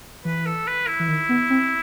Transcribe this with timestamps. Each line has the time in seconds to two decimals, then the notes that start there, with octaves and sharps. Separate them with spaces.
0.25 E3 B4
0.46 A4
0.67 B4
0.87 E4
1.00 E3
1.08 D#3
1.29 B3
1.50 C4